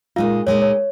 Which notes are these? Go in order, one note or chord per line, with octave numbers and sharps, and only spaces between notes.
A#2 G#3 D#4 F4 F5
A#2 G#3 D#4 C#5
C#5